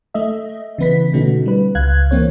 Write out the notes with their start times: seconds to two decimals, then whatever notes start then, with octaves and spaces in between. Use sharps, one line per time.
0.14 A3 D#5 E5
0.78 C#3 E3 B3 B4 B6
1.13 B2 D3 A3 C#4 D#4 F#4
1.46 G3 B4
1.75 C#2 F5 F#6 G#6
2.11 E3 A#3 C4 C#5